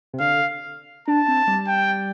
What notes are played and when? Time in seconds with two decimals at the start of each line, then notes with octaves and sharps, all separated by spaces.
0.14 C3
0.20 D3 F5
1.08 D4 A5
1.28 C4
1.47 G3
1.67 G5